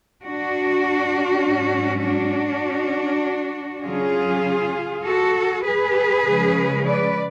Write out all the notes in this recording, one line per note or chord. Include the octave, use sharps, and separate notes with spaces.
D4 F#4
G#2 F#3 C#4
D4 F#4
C#3 F#3 C#4 F4 G#4
F#4 A4
G#4 B4
C#3 F3 G#3 C#4
B4 D5